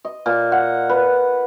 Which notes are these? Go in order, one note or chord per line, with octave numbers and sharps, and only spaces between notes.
D#5
A#2
F#5
B4